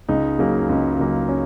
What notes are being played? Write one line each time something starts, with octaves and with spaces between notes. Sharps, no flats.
C#2 D#4
C#3 F#3 A#3
C#2
C#3 F#3 A#3
C#4